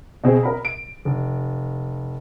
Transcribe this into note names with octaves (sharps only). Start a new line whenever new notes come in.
B2 C4 G#4
A#4 B5
D7
F1